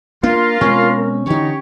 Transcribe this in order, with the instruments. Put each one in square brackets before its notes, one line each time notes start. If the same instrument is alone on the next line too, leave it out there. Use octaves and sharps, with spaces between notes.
[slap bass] A#3 D4 [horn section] F4 [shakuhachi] A#4
[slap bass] B2 G#3 C4 [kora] C#4
[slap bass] D3 E3 [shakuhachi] D#4 [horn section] G4 C#5